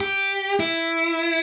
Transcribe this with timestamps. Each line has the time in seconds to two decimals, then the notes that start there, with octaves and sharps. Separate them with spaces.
0.01 G4
0.60 E4